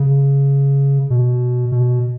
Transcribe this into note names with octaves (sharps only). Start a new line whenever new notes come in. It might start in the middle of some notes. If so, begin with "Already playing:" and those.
Already playing: C#3
B2
B2